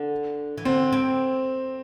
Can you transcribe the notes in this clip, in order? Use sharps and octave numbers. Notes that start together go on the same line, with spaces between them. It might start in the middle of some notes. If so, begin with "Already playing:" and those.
Already playing: D3
E3
D3 C4
C4